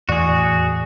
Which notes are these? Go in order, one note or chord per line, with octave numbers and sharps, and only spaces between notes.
E2 A2 F#4 G#4 D5